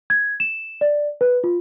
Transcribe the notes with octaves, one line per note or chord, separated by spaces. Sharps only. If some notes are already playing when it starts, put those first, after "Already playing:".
G#6
E7
D5
B4
F4